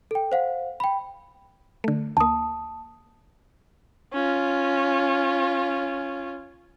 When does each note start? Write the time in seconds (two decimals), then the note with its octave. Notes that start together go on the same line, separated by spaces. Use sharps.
0.11 A4 G5
0.32 C5 F5 F#5
0.80 G5 B5
1.84 D3 A3
2.17 D2 A#3 A5 D#6
4.13 C#4 F4